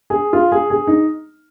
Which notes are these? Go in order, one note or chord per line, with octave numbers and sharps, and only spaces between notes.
G#4
F4
G#4
G#4
D#4